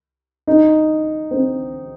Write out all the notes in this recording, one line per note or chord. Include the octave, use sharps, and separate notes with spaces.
D#4
C4